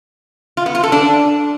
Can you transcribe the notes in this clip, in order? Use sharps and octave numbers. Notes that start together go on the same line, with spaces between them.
F4
B3
F4
A4
D4